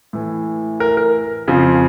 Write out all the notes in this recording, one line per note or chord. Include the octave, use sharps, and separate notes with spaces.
A2 E3
A#4
A#4
F2 C#3 F3